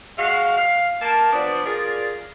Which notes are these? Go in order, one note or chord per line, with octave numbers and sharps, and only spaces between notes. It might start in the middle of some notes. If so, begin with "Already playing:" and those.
G#3 F#4 F5
F5
A#3 A5
F3 B3 D4 D5
F4 G#4 A#4 D5